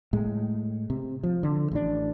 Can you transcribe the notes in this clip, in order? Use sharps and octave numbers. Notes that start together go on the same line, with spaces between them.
A2 G#3
C3
F3
D3
A1 D4